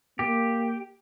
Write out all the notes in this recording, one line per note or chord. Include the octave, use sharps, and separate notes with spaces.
A#3 G4